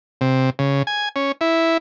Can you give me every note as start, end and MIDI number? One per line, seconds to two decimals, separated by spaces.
0.21 0.50 48
0.59 0.83 49
0.87 1.09 80
1.16 1.32 61
1.41 1.77 64